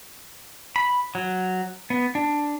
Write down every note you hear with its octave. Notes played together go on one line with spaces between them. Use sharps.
B5
F#3
B3
D4